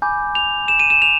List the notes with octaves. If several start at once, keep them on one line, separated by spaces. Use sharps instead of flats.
G#5 B5 D6 G6
F7
E7
D#7
E7
F7